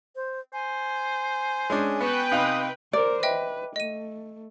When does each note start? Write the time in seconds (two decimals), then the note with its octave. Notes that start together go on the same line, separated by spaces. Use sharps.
0.16 C5
0.53 C5 G#5
1.70 G#3 C#4 D4
2.01 B3 F#4 B4 G5
2.31 C3 D#4 F5 D#6
2.93 A#4 C5 D5
3.23 B4 D#5 E5 G5
3.76 A3 D#5 D#7